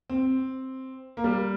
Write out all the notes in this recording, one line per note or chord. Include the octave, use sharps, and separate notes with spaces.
C4
A#3
G3